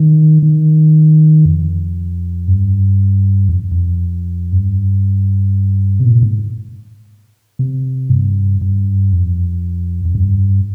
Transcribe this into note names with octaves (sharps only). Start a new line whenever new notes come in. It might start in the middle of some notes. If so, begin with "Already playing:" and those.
Already playing: D#3
D#3
F2
G2
F2
F2
G2
C3
A#2
G#2
C3
G2
G2
F2
F2
G2